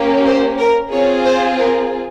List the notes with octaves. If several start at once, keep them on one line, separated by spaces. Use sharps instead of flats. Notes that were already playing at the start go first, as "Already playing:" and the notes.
Already playing: A#3 C#4 G4
C5
A#4
C4 F4 G#4 C#5
C5
A#4